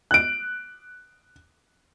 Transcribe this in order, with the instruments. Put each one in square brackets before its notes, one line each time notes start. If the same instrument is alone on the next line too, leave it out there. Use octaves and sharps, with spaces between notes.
[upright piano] F#6 D7